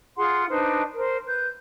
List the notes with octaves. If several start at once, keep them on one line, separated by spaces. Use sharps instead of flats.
F4 G#4 F#5 C6
D4 D#4 B4 C5
A#4 C5
B4 G6